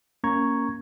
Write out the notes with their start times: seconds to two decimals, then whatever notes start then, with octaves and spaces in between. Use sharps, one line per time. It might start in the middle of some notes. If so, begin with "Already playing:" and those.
0.24 A#3 C#4 A#5 C#6 G#6